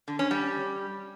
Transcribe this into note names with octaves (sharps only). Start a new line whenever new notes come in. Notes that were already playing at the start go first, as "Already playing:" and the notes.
D3
C#4
G3